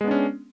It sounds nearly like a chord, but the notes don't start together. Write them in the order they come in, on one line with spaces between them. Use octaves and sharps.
G#3 B3 D4 C#4